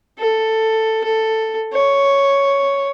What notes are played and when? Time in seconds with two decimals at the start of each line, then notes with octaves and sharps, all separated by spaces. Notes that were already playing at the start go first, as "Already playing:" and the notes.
0.19 A4
1.04 A4
1.73 C#5